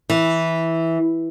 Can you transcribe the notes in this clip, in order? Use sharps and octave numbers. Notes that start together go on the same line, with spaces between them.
E3